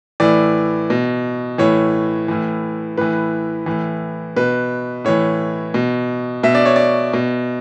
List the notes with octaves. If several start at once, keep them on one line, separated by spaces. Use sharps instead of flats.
A2 E3 D5
B2
A2 E3 C#5
A2 E3
A2 E3 B4
A2 E3
B2 B4
A2 E3 C#5
B2
B2 E5
D5
C#5
D5
B2